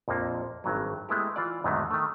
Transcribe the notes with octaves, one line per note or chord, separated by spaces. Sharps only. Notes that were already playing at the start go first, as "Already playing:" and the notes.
A#1 F2 F3 A#3
G#1 G2 F#3
G#3 A3 B3 E4 G4
E3 F4 D5
E2 G#2 D3 D#3 F#3 A3
D#3 A3